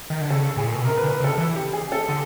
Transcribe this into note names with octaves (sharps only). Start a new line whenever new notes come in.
D#3
D3
C#3 A4
A2 G#4
A#2
B2
C3 A#4
B4
D3
B4
C#3
A4
E3
G4
G#4
A4
D3